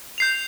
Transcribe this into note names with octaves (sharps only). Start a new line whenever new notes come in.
G6 C7 F7